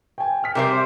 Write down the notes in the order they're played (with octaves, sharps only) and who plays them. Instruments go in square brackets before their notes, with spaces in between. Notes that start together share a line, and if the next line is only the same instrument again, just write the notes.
[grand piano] G5 G#5
G5 F6 B6
[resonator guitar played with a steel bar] C3 G3 C5 [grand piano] A#4 E5